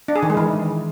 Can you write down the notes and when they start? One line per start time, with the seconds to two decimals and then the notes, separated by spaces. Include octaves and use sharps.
0.08 D4
0.16 G#4
0.23 D#3
0.30 G#3
0.37 E3